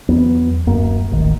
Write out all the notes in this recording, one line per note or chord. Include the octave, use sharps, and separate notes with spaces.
E2 F#3 B3
D1 F#2 A#3
D#1 A1 G#2 D#3